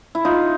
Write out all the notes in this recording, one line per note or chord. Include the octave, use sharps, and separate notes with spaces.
E4
D#4 F4